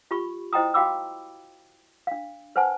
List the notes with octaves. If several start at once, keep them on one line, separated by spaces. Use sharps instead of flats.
F4 G4 B5 C#6
E4 C5 D#5 G5 A#5 D#6
F#4 F5 G5 B5 D6 E6
D4 F5
B4 C5 F#5 G#5 A5